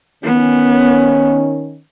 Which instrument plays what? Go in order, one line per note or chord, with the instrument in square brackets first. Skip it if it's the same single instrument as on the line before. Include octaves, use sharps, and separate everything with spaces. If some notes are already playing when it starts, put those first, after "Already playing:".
[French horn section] D#3 C#4 [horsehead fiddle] B3